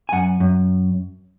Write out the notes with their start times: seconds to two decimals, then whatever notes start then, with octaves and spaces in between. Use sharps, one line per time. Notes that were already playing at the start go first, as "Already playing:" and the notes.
0.09 G#5
0.12 F#2 F#5
0.40 F#2